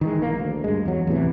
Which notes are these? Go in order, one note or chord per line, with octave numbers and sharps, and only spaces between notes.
D#3 E3 G#3
A#1 A#3
D2
G2 G#3
E2 F#3
E2 A2 C3 E3